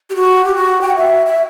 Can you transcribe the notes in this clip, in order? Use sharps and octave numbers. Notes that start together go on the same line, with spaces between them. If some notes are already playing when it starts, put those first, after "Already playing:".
G4
F#4
G4
F#4
G5
F#5
E5
E5